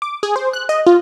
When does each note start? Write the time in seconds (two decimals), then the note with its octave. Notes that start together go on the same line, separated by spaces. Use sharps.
0.02 D6
0.23 G#4
0.36 C5
0.53 F#6
0.69 D#5
0.87 F4